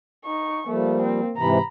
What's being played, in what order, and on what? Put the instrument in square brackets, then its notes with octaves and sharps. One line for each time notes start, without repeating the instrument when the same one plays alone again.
[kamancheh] D#4 C#6
[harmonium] F3 G3 [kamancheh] A3 [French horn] A#3
[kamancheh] C4
[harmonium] G#2 C3 E3 [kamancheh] A#5 B5